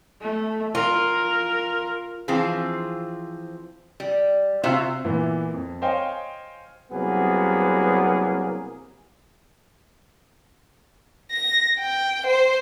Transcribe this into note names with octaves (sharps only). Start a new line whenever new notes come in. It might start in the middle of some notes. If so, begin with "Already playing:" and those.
A3
F4 A#4
E3 F3 C4 F4 G#4
G3
C3 F4 F#4 C5 E5 F5
A#2 E3 B3 E4
F2
C5 C#5 D#5 F5 G5 G#5
C2 F#3 A#3 B3 G#4
A#6
G5
C5